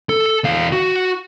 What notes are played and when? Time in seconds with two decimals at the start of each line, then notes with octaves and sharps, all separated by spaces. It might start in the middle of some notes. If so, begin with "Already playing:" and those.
0.09 A4
0.44 E2 F5
0.72 F#4